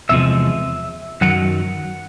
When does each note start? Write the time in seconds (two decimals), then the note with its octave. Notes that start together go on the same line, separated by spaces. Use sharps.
0.09 E2 C3 F3 G#3 E5
1.21 F#2 D#3 F#3 F#5